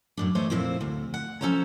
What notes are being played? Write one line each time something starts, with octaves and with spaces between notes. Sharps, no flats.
F#2 A2 D4
E3 A3 C5 C#5 D#5
F2 A#2 C4 E4 C5
D2
F#5
F3 C#4 A4 C5 C#5 A#5